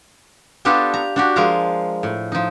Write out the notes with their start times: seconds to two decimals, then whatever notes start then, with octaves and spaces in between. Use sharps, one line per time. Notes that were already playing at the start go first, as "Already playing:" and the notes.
0.65 B3 D4 F4 G4 A4
0.94 A#5
1.16 D4 F#4 G4
1.36 F3 G#3 A#4 F5 A#5
2.03 A2
2.32 F3 D#4